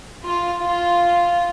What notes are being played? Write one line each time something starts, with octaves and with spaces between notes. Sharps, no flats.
F4
F4